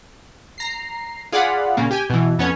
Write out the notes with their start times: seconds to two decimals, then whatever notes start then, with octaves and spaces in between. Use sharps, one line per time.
0.58 A#5 C7
1.32 F4 G#4 D5 F5 F#5 B5
1.77 A#2 C#3 A#3
1.91 G4 G5 G#5
2.10 B2 E3
2.38 F2 B3 C#4 C#5